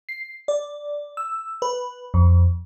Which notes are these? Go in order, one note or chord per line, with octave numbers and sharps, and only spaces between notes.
C7
D5
E6
B4
F2